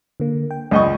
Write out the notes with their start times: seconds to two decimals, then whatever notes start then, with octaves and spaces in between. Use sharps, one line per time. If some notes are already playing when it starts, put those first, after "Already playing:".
0.20 D3 A#3
0.51 G5
0.71 C#2 D5 D#5 B5 C#6 G6